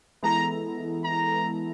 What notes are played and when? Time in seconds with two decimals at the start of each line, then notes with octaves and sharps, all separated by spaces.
0.23 E3 G#3 B3 E4 A4 A#5
1.03 A#5